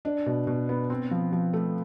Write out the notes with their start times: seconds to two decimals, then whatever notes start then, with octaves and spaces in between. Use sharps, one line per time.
0.05 D4
0.26 B2
0.47 B2
0.69 B3
0.90 C4
1.11 F3
1.32 F3
1.53 A3